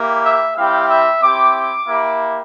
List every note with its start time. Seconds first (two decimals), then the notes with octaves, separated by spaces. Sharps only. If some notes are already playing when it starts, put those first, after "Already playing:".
Already playing: A#3 E4 G4
0.24 E5
0.56 G3 C4 E4 G4 F5
0.88 E5
1.21 C4 E4 G4 D6
1.55 D6
1.87 A#3 E4 G4